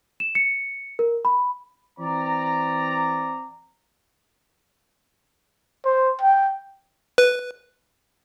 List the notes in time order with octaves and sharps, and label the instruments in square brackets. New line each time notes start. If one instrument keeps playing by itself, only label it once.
[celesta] E7
C#7
A#4
B5
[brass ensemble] E3 C4 D5 A#5
[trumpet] C5
G5
[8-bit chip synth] B4